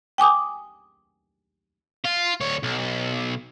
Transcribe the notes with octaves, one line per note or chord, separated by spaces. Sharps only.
G5 G#5 D6 D#6
F4
D2 C#5
B1